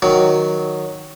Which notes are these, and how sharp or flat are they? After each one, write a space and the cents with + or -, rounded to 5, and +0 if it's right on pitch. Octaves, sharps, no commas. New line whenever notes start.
D#3 +0 F#3 +0 C#6 +35